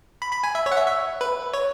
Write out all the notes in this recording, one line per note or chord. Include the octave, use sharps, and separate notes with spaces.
B5
B5
G#5
E5
C#5
F#5
E5
E5
B4
C#5